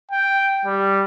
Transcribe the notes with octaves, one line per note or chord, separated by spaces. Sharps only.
G5
G3